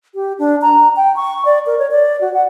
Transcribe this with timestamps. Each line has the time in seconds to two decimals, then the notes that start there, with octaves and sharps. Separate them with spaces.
0.15 G4
0.39 D4
0.62 A#5
0.97 G5
1.16 C#6
1.45 D5
1.66 A#4
1.79 C#5
1.91 D5
2.21 F#4
2.34 F#5